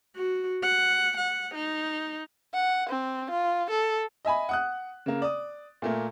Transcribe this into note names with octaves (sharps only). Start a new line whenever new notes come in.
F#4
F#5
F#5
D#4
F#5
C4
F4
A4
D#5 E5 G#5 B5
F#5 D#6 F#6
C#3 A#3
D5 D#6
A#2 A3 A#3